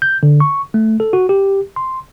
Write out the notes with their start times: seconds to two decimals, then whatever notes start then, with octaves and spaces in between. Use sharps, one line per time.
0.02 G6
0.23 D3
0.40 C#6
0.74 A3
1.00 A4
1.13 F#4
1.29 G4
1.76 C6